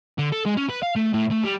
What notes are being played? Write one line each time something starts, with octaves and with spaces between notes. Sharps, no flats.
D3
A4
G#3
C#4
B4
F5
A3
A2
A3
G3